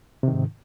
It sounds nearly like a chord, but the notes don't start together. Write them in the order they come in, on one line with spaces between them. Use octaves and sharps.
C3 D#3 G#2